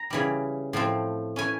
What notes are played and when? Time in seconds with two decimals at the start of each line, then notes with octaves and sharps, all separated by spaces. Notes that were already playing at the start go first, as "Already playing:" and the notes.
Already playing: A#5
0.10 C#3 E3 G3
0.73 A2 F3 A3 C4
1.36 E3 A3 C#4 E4 G#5